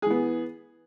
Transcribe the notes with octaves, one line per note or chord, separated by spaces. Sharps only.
E3 B3 G#4